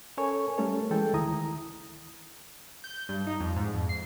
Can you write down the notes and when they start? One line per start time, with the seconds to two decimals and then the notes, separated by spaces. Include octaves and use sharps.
0.17 C#4 A4 A#4 C#5 G#5 C#6
0.58 G3 A3 C#4 A4 A#4 C#5
0.91 E3 G#3 A4 G5
1.13 D2 D#3 E4 A#5 D#6
2.84 G6
3.09 G2
3.27 D#4
3.40 F2
3.56 G#2
3.74 F2
3.89 C7